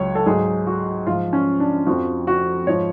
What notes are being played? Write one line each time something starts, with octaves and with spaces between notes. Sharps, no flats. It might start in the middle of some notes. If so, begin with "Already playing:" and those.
Already playing: C#2 F#3 C#5
A4
G#2 F#3 G#4
F#4
G#2 F3 F4
C#4
D4
F2 F3 F#4
F#4
G#2 F3 C#5